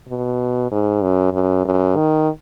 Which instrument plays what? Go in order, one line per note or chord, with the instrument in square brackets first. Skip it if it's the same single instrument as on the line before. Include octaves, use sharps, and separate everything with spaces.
[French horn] B2
G#2
F#2
F#2
F#2
D#3